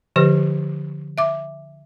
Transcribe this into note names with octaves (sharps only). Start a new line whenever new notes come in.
D3 F3 G4 B4
E5 D6